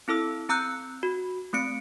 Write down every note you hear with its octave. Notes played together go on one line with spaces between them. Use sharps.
C4 E4 A4 E6
C4 A#5 E6 F#6 G6 C#7
F#4
A3 C4 C#7 D7